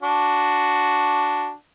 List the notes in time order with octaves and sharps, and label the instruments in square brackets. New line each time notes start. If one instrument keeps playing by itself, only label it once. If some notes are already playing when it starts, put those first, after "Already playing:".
[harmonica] D4 F#4